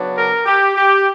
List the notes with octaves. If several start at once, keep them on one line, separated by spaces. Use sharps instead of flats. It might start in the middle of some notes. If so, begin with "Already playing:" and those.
Already playing: C#3 F#3 B3 D4
A#4
G4
G4